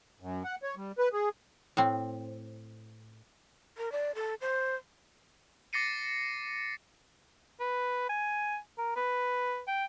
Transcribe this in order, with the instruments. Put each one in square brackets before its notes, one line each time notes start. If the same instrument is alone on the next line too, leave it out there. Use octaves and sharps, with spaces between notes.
[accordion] F#2
F#5
C#5
G3
B4
G#4
[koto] A2 C4
[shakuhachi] A#4
D5
A4
C5
[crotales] D6 A6 A#6 C7 C#7 D#7
[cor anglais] B4
G#5
A#4
B4
G5